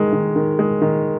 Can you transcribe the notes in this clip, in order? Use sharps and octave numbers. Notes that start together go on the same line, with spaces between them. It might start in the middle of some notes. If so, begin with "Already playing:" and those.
Already playing: D#3 G#3
D#3
D#3
G#3
D#3